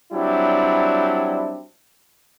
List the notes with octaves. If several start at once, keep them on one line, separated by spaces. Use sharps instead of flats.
F#3 G3 C4 D4 E4